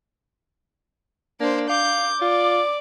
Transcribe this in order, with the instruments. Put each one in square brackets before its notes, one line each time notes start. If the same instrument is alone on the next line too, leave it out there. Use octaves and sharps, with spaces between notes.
[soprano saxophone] A#3 [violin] D4 C5
[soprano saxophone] F5 [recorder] D6 [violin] G6
[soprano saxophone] F4 [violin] D5